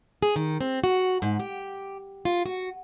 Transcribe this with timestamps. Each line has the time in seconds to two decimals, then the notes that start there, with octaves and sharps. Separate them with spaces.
0.23 G#4
0.36 D#3
0.61 C4
0.84 F#4
1.22 G#2
1.40 G4
2.25 F4
2.46 F#4